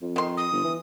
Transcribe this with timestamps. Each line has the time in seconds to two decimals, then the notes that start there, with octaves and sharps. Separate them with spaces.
0.02 F2
0.16 D#3 C6
0.37 D#6
0.52 G1
0.64 E3